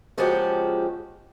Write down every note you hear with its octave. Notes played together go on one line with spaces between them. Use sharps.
C#3 F3 G#3 A#3 F#4 G4